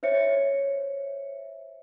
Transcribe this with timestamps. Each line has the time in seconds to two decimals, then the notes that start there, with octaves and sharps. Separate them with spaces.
0.03 C5 C#5 E5 C#7